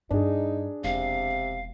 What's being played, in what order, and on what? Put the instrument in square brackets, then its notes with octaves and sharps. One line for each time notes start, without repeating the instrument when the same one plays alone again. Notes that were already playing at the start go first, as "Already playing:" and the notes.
[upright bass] G2 [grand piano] D4 G#4 [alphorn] D#4
[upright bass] E1 [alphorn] C3 [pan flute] F5